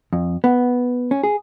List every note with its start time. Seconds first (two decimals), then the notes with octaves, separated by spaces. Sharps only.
0.13 F2
0.44 B3
1.11 C#4
1.23 G#4